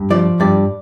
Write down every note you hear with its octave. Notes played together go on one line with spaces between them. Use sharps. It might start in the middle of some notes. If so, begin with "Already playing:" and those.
Already playing: G2
F3 D5
G2 D5